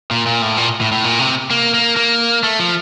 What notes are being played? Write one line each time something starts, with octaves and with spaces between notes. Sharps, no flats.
A#2
A#2
A2
A#2
A2
A2
A#2
C3
A#3
A#3
A#3
A3
F3